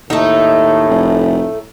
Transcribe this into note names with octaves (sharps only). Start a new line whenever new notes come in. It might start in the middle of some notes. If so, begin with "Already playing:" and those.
D#2 A2 A3 D#4
F1